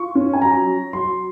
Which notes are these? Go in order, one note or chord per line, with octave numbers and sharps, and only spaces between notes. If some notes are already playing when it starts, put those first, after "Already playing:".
Already playing: F4 C#6
C#4
G#5
F#3 A#5
F#3
F#3 C6